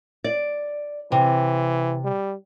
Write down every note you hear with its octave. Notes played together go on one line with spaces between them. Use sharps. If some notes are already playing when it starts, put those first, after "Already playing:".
D5
C3 E3
G3